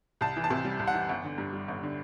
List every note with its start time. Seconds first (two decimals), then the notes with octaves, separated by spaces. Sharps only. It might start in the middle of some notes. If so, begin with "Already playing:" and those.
0.21 C2 A5
0.36 E3
0.44 A5
0.50 C3
0.65 G3
0.79 C2
0.87 F#5
0.94 E3
1.09 G1
1.24 D3
1.38 G2
1.53 G3
1.68 G1
1.83 D3